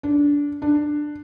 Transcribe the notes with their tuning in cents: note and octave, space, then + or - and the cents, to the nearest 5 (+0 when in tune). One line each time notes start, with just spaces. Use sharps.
D4 -20
D4 +10